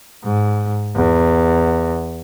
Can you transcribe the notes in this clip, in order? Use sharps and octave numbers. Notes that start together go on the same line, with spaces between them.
G#2
E2